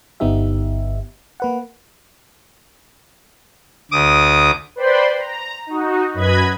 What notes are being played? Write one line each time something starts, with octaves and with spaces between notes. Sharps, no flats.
G1 D3 B3 D#4 G4 E5
A#3 B4 F#5
D2 D6 D#6
B4 C5 D5 G5 B5 C6
A#5
D#4 F#4
F#2 B4 D#5 B5 G#6